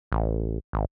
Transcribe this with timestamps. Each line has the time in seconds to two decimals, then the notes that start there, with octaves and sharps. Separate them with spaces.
0.12 A1
0.73 G#1